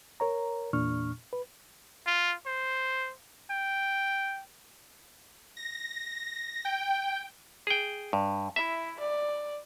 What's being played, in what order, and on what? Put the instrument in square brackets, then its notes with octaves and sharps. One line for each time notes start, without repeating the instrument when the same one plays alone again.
[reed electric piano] A#4 C#5 A#5
E2 A#2 D4 C#6 F6
B4
[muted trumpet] F4
C5
G5
[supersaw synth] A#6
G5
[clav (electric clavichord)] G#4 G5
G2
[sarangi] E4 [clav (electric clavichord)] E5
[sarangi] D5